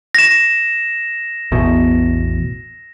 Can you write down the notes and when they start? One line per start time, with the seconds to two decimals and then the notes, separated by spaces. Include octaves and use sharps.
0.15 A#6 E7
1.52 A1 E2 B2